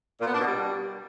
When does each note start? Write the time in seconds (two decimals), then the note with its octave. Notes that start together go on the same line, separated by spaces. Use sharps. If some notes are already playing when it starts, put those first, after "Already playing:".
0.21 A#2
0.27 B3
0.34 D4
0.41 B2
0.47 G3